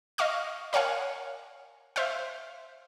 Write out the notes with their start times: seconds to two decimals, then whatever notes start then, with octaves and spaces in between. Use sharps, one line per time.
0.18 D#5 F5 C#6 F6
0.73 A#4 C#5 F5 F#5 G#5
1.96 C5 E5 F5